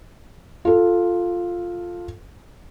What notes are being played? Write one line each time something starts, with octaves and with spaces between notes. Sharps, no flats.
F4 A4